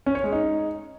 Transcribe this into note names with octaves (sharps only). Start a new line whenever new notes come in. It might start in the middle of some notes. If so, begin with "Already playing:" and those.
C#4
C#5
G#3
D#4